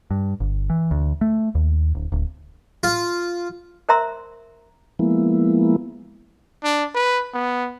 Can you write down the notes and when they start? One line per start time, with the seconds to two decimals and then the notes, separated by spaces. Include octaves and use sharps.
0.11 G2
0.40 G1
0.70 E3
0.91 D2
1.21 A3
1.55 D#2
1.95 D1
2.12 D1
2.83 F4
3.89 A#4 C5 E5 A#5 C6 E6
4.99 F3 G#3 A#3 B3 E4
6.64 D4
6.95 B4
7.34 B3